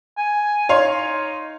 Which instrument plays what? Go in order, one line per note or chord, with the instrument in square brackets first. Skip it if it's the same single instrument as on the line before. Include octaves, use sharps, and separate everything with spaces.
[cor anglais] G#5
[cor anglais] D#4 [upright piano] C#5 F5 C6